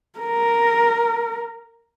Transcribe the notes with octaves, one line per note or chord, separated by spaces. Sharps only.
A#4